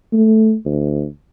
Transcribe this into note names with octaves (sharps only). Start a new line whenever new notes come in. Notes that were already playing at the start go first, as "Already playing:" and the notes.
A3
D2